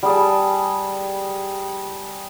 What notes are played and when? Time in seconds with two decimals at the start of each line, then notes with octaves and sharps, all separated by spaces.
0.03 G3 G#4 A5